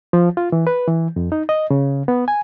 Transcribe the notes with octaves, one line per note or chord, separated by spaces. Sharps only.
F3
F4
E3
B4
E3
F2
D#4
D#5
C#3
B3
G#5